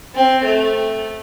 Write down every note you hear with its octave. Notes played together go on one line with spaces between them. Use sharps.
C4
A3